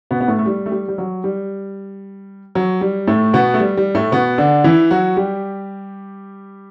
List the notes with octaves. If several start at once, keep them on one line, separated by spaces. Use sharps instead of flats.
B2 B3
B3
A2 A3
A3
G3
A3
G3
G3
F#3
G3
F#3
G3
A2 A3
B2 B3
A3
G3
G3
A2 A3
B2 B3
D3 D4
E3 E4
F#3 F#4
G3 G4